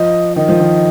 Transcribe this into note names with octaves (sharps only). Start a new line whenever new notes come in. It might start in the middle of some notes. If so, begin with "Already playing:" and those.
Already playing: F3 D#5
D#3 D#5
F3
D#3